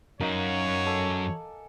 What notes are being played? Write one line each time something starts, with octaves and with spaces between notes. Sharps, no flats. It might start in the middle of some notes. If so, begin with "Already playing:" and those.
F#2 D#4 F#4 A#4 C#5 F5
A4 G#5 D6